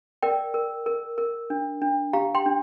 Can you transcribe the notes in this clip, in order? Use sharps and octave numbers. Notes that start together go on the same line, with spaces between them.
A#4 D5 G5
A#4
A#4
A#4
D4
D4
G4 F5 A#5
G5 C6
D4